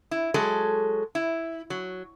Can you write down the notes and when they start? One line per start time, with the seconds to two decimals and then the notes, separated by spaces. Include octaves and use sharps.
0.11 E4
0.34 F#3 G#3 A4
1.15 E4
1.70 F#3